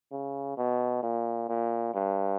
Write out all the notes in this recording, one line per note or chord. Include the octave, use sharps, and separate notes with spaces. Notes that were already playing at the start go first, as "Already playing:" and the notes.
C#3
B2
A#2
A#2
G2